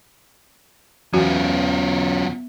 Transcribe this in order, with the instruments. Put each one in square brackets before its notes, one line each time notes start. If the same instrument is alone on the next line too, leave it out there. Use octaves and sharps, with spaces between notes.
[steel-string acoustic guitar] E2 [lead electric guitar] F#3 F4 [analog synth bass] C#4 [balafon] F#4